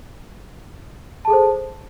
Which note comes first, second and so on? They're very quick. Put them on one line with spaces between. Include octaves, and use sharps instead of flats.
A5 G#4 A4 C5